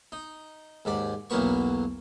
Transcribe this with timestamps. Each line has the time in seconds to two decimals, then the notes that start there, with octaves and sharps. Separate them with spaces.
0.12 D#4
0.85 D#2 G#2 D5
1.30 B1 E2 F#3 A#3 B3 C#6